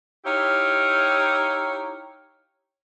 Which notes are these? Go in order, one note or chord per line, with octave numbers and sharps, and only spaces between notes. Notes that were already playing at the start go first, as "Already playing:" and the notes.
D#4 E4 G4 C#5 F5